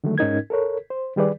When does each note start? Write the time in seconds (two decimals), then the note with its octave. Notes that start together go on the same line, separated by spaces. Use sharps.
0.04 D3 D#3 F#3 G#3 A3
0.18 G#2 C#4 D#4 A#4 G#6
0.50 A4 A#4 C#5
0.90 C5
1.16 D#3 G3 G#4 B4 D5